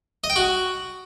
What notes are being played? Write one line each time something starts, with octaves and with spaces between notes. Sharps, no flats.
D#5
G5
F#4